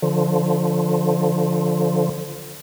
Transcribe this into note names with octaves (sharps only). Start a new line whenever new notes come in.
D3 F3